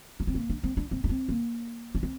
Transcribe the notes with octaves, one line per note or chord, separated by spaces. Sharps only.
D4
C4
A#3
D4
C4
D4
C4
D4
C4
A#3
D4
C4